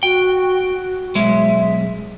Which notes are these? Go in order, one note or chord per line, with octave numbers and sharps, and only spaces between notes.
F#4 G5
B1 G#3 E5